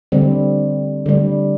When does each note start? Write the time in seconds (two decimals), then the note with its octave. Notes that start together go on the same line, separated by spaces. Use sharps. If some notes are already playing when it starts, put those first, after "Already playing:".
0.12 D3 G3 C4
1.06 D3 G3